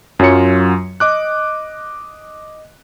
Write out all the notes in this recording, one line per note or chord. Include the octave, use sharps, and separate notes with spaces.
F#2 F#3 F4 C#5 C#7
D#5 D6 F#6